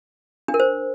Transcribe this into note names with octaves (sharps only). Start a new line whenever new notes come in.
D4
A#4
C5